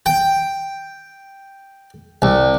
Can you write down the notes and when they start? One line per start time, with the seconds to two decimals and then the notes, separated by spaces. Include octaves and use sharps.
0.06 G5
2.22 C2